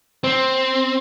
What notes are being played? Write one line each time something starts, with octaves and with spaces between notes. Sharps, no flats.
C4